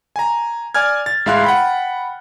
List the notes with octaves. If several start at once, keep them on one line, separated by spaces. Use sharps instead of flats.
G#5 A#5
D5 G#5 F6 G#6
A6
A1 G#3 E4 F5 C6 F#6
F#5 G5 B5